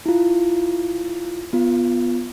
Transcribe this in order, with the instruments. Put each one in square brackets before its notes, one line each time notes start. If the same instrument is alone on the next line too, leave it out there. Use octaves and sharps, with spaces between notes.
[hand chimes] E4 F4
B3 F4